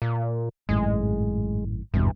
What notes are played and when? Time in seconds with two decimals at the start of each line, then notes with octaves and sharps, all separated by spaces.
0.02 A#2
0.69 G#1 F#2 A2 G#3
1.94 G#1 E2 G2 B2